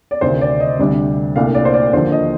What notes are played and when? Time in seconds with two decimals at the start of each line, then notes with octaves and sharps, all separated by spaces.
0.11 D5
0.21 D2 C3 D#3 C5
0.41 D5
0.60 D#5
0.79 D2 C3 G3 D4
1.36 C2 A#2 A3 D4 F5
1.55 D5
1.65 C5
1.74 D5
1.93 D#2 D3 F3 C5
2.12 D#5